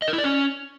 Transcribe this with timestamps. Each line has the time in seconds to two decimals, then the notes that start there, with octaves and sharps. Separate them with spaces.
0.02 D#5
0.08 A#4
0.13 E4
0.18 D5
0.24 C#4